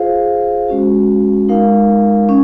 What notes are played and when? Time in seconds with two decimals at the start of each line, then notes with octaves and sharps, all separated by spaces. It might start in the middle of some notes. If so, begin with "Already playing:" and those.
Already playing: F4 G#4 C5 F5
0.68 G#3 C#4 F#4
1.49 G#3 D#4 A#4 F5
2.29 C#4